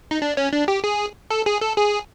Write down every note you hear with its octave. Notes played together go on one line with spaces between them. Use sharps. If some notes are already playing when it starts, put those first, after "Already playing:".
D#4
D4
C#4
D4
G4
G#4
A4
G#4
A4
G#4